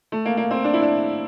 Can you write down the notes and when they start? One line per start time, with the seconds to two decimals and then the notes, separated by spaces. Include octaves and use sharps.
0.12 A3
0.25 A#3
0.37 A#3
0.51 C4
0.64 D4
0.73 E4
0.82 D4